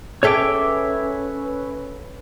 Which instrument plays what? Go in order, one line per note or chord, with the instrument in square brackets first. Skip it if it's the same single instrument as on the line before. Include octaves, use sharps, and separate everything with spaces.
[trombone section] C#4 B4 [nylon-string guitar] G#4 A4 G5 [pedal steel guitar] C#5 E5 D6